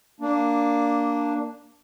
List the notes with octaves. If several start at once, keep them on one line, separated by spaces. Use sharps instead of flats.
A#3 D4